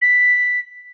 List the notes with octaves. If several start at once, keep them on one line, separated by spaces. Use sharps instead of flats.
B6